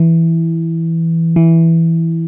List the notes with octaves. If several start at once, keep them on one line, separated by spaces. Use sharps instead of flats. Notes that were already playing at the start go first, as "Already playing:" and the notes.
Already playing: E3
E3